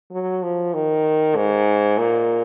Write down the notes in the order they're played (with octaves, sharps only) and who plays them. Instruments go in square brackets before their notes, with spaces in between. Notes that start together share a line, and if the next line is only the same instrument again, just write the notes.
[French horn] F#3
F3
D#3
G#2
A#2